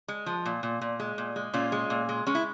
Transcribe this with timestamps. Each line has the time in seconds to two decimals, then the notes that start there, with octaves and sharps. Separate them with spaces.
0.08 G#3
0.26 F3
0.46 A#2
0.63 A#2
0.81 A#2
1.00 G#3
1.18 A#2
1.36 G#3
1.54 A#2 C#4 F4
1.72 G#3
1.90 A#2
2.09 G#3
2.27 G#3 C#4
2.35 E4